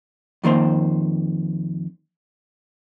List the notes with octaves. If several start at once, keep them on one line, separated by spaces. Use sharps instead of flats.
F2 D#3 A#3 C5